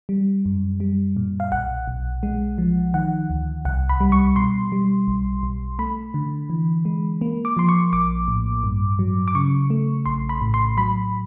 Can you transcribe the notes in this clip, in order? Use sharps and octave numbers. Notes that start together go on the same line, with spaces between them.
G3
F#2
G3
A#2
F5
B1 F#5
B1
G#3
F3
D#3 F#5
D2
C2 F#5
B5
G3
C#6
B2 C6
G3
B1
B1
A3 B5
D3
E3
G#3
A#3
D6
F3 C6
C#6
A#1 D6
A2
G2
F#3
D6
C#3 C#6
A3
A#1 C6
B5
A2
C6
F#3 B5